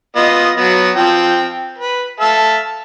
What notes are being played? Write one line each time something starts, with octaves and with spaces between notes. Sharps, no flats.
B3 F4 D#5
F#3 B3
F3 C4 G5
B4
A4 E5 F5